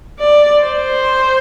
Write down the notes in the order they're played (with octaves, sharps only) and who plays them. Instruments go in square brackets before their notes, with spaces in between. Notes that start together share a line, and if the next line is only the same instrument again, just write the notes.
[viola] D5
C5